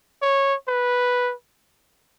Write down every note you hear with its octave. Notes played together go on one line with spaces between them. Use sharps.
C#5
B4